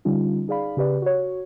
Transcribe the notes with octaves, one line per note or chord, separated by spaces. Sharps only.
D3 G3 C#4 D#4 F4
D#4 G#4 D5 F5 B5
C#3 G4 B4 D5
F#4 C#5